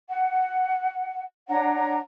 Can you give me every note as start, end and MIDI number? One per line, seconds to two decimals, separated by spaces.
0.09 1.22 78
1.48 1.99 62
1.48 1.99 73
1.48 1.99 78
1.48 1.99 82